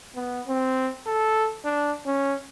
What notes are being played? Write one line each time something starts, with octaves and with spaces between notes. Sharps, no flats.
B3
C4
A4
D4
C#4